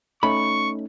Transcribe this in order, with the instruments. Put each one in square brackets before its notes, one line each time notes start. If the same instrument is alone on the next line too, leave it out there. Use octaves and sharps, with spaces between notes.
[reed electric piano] A3 C#4 D#4 [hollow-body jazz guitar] B5 [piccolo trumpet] C#6